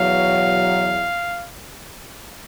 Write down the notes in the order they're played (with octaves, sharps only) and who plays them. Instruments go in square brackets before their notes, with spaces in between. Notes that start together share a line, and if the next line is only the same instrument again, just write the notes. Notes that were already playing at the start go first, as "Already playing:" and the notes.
Already playing: [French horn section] E2 B2 F#3 [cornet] F5